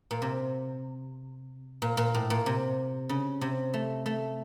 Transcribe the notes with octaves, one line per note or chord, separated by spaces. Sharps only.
A#2
C3
A#2
A#2
A2
A#2
C3
C#3
C3
A3
A3